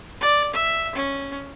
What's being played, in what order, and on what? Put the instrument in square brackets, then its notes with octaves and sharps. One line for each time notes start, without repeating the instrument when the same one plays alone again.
[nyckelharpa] D5
E5
C#4